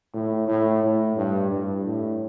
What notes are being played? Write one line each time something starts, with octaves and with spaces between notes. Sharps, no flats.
A2
A2
A2
G2
G2
A2